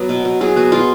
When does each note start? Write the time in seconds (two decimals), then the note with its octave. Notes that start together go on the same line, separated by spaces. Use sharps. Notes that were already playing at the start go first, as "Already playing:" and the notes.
Already playing: F#3 B3
0.09 B2
0.25 B2
0.41 F#3 G#4
0.56 B3 F#4
0.72 B2 F4